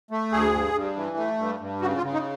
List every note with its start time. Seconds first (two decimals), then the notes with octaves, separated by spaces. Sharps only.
0.11 A3
0.32 D2 G#4
0.53 G2
0.74 G2
0.96 E3
1.17 A3
1.39 G2
1.60 G2
1.81 C#3 F#4
1.97 F4
2.03 C#3
2.13 D#4